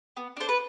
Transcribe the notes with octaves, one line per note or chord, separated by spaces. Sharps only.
B3
D4 A4 C5
B4